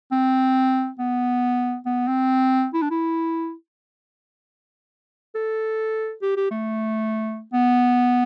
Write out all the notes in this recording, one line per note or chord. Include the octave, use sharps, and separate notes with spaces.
C4
B3
B3
C4
E4
D4
E4
A4
G4
G4
A3
B3